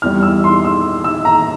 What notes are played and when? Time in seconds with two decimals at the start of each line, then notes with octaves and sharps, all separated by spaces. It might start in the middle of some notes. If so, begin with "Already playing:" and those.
0.02 E2 E3 G3 F6
0.23 E6
0.44 C6
0.65 E6
1.04 E6
1.25 A#5